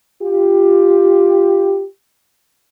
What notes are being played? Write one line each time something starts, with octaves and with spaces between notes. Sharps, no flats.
F4 G4